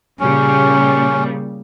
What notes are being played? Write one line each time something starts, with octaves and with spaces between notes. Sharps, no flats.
A#2 C#3 G3 C#4